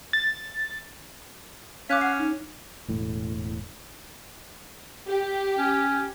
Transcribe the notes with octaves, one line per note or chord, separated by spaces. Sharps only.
A6
C#4 F5 D6 F#6 B6
F#5 F6 F#6 C7
D#4
E1 A2
G4
C#4